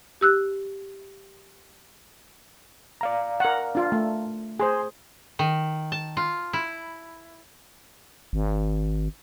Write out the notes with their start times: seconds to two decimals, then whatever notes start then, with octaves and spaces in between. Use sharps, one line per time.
0.21 G4 E6 F#6
3.01 D5 F5 A#5
3.40 A#4 F#5
3.75 D4 F4
3.92 A3
4.60 G#4 C5 G#5 C6
5.39 D#3
5.92 A5
6.17 F4
6.53 E4
8.33 G#1